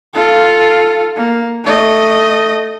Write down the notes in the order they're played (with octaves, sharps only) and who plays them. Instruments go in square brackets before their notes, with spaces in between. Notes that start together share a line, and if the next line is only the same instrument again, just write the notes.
[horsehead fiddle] F4 A4
A#3
A3 D#5